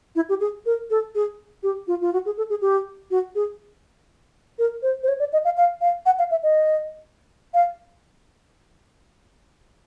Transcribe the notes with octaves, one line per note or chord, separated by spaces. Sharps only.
E4
G4
G#4
A#4
A4
G#4
G4
F4
F4
F#4
G#4
A4
G#4
G4
F#4
G#4
A#4
C5
C5
C#5
D5
D#5
F5
F5
F5
F#5
F5
E5
D#5
F5